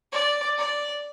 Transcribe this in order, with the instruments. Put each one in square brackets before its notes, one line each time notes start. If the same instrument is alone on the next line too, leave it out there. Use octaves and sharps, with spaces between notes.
[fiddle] D5
D5